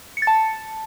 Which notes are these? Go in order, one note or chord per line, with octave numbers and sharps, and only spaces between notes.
C#7
A6
A5